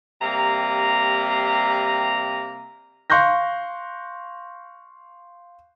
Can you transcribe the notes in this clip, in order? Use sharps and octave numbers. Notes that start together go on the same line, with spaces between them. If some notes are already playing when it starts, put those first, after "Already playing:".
C3 G3 A#3 A#5
F5 C6 C#6 F#6 G6 A#6